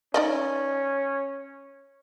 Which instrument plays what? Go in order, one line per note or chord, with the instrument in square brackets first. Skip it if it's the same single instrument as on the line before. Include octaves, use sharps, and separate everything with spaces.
[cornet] C#4 [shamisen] D#4 D5 D#5